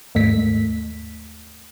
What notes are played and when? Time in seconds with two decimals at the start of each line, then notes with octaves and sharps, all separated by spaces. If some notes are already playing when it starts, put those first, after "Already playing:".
0.15 D#2 G#2 A3 B6